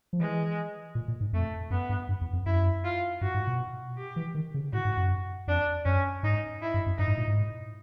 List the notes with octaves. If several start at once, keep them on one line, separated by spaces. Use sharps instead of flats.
F3
E3 G#3
A#2
A#2
G#2
F2 A3
F#2 B3
G2
G2
E2
F2
F#2 E4
F4
G2 F#4
G#2
B2
G4
E3
D#3
C#3
A2 F#4
G#2
F#2
F2 D4
F#2 C#4
G#2 D#4
E4
G2
F#2
G2 D#4
G#2
A#2
G#2